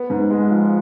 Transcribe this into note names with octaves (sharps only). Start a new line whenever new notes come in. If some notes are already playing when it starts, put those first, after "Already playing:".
Already playing: B3
G#2
G#3
F3